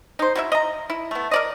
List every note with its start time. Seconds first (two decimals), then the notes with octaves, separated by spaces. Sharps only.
0.19 D#4 C5
0.35 F#3 E4 E5
0.52 D#5 A#5
0.90 E4
1.11 A3 B3
1.31 A#4 D5 D#5